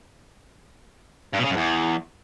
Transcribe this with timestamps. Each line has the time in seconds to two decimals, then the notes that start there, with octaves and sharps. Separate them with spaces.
1.34 G2
1.40 B2
1.45 C#3
1.51 F#2
1.57 E2